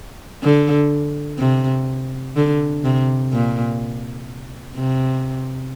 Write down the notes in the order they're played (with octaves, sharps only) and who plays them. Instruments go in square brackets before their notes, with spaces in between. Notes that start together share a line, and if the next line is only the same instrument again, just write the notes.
[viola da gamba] D3
C3
D3
C3
A#2
C3